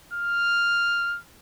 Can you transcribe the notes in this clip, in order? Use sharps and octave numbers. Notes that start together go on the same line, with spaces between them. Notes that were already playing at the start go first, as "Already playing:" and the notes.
F6